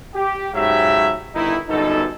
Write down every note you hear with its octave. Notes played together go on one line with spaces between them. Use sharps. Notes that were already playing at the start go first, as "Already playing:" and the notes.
G4
G#2 C#3 F#3 G4 E5
G1 D#3 D#4 E4
G1 F#2 B2 D#4 A4